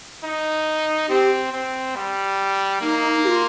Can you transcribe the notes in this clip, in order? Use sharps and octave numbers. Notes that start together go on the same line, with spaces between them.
D#4
C4 G4
C4
G3
A#3 D#4
G4
F4